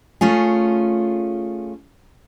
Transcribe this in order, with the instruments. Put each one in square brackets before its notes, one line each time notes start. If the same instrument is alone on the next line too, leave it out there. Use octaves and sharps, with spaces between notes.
[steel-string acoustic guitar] A3 C#4 F4 G#4